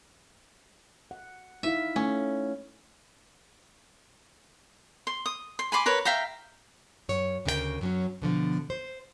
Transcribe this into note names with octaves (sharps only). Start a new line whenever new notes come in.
F#5
D#4 E4 E5 F5
A3 C#4
C6
D#6
C6
G#5 B5 C6 D6
A#4 B4 C#5
E5 F5 G5 A#5
F#2 C#5
D2 C#3 C#4 A#4 B4 G5
F#2 F#3 C#4
B2 D3 F3
C5